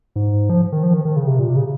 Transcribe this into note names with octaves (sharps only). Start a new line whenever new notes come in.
G#2
F3
D#3
F3
D#3
D#3
C#3
C3
A#2
C3
C#3